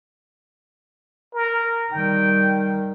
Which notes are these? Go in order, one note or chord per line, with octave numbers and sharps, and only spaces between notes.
A#4
D#3 G3 G5